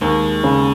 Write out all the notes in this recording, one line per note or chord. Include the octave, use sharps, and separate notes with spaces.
D#2 G#3
C#3